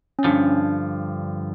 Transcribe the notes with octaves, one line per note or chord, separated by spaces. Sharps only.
C#4
G2 D3 F3 D4